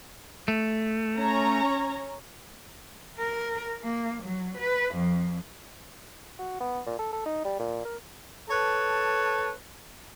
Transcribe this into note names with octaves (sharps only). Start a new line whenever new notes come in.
A3
C#4 C#5 A#5
A#4
A#3
F#3
B4
F2
F#4
B3
A#2
A4
A4
D#4
G3
A#2
A#4
A4 B4 C#5 A5